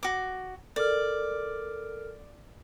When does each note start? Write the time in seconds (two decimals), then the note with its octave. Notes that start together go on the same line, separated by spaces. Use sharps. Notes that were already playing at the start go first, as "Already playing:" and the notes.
0.03 F#4 D6
0.76 A4 A#4 D5 F6